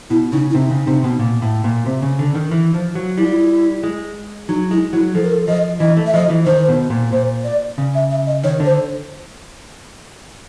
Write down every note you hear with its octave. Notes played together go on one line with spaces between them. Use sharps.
B2 E4
C#3 D#4
E4
C3 D#4
C#3
C3
B2
A#2
A2
A#2
C3
C#3
D3
D#3
E3
F3
F#3
G3 E4
F4
E4
G#3
F#3 D#4
G#3 E4
F#3 E4
F3 A4
A#4
A4
F3 D#5
E3 D#5
A3
E5
F3 D#5
E3
D#3 C5
B2
A#2
A#2 C5
D5
C#3
E5
E5
D#5
D#3 C#5
D3
C5